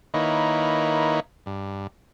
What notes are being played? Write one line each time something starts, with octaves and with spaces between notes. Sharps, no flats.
D#3 A#3 D#4 E4 B4 C#5
G2